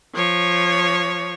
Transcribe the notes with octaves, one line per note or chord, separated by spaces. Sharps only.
F3 C#5